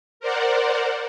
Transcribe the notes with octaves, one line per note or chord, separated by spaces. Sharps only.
A#4 C5 D5 F#5